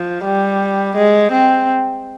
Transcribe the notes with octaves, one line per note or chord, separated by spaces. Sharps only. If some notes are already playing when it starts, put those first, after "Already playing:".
Already playing: F3
G3
G#3
C4